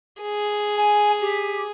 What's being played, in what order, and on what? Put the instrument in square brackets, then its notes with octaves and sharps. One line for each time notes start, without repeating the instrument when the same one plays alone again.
[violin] G#4
[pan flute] G#5
G4